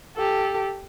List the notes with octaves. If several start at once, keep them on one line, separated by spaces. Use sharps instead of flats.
G4 A4